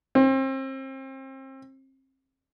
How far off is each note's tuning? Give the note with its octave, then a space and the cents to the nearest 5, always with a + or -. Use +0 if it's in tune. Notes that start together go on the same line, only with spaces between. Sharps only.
C4 +35